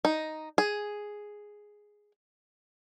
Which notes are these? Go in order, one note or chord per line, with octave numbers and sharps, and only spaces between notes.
D#4
G#4